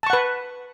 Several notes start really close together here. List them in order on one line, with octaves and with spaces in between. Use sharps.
A5 C#6 F#5 B4